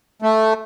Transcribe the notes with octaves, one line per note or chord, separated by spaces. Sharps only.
A3